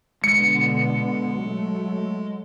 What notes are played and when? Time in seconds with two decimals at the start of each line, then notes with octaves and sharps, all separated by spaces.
0.24 B2 D3 G#3 B3 C#7
1.36 F#3 A3